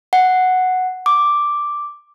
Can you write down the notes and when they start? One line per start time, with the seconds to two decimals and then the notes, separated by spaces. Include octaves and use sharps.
0.13 F#5
1.06 D6